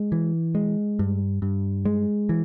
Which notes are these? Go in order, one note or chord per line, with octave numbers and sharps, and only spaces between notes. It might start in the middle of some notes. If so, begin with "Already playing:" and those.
Already playing: G#3
E3
G#3
G2
G2
G#3
E3